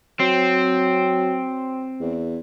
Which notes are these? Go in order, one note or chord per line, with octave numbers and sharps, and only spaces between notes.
F#3 C4
E2